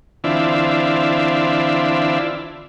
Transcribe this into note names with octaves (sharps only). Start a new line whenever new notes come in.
D3 E3 C4 D4 E4 F4